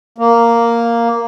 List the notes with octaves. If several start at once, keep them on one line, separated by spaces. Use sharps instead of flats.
A#3